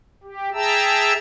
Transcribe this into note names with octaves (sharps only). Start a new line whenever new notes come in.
G4
G#4 E5 G5 A5 A#5 E6